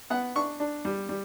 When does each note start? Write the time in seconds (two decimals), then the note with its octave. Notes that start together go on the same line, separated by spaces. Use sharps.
0.10 B3 F#5
0.36 D4 C#6
0.60 D4
0.85 G3
1.09 G3